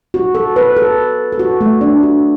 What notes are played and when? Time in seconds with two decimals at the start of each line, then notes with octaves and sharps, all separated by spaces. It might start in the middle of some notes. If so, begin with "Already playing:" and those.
0.14 F#4
0.35 A4
0.56 B4
0.76 A4
1.32 A4
1.39 F#4
1.61 A3
1.81 D4
2.03 F#4